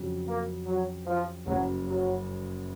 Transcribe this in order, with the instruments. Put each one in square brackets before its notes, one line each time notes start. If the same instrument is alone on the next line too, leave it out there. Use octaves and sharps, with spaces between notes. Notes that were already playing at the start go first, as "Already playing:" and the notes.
Already playing: [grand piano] F2 C#3 F#3
[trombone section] A#3
F#3
F3
[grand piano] F#1 F#2 C#3 [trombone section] F#3
[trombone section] F#3